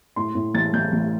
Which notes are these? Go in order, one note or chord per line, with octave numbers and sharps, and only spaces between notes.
A2 C6
A2
A1 A6
A1 G6
A1